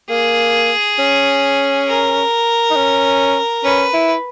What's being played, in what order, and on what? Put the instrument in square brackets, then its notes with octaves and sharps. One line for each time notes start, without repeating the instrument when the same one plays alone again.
[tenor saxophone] A#3 [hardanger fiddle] G#4
[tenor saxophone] C#4
[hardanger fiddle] A#4
[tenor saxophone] D#4
C#4
[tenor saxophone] C#4 [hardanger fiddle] B4
[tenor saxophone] E4